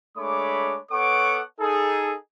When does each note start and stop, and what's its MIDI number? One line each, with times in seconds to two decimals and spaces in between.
0.18 0.78 56
0.18 0.78 57
0.18 0.78 62
0.18 0.78 73
0.18 0.78 83
0.18 0.78 86
0.91 1.41 59
0.91 1.41 69
0.91 1.41 73
0.91 1.41 78
0.91 1.41 85
0.91 1.41 86
1.60 2.14 63
1.60 2.14 68
1.60 2.14 69